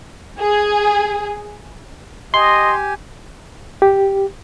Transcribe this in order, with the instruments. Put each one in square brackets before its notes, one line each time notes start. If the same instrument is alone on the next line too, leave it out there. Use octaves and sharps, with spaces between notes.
[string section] G#4
[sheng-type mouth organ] G4 G#5 [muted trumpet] D#5 [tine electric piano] C6
[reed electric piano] G4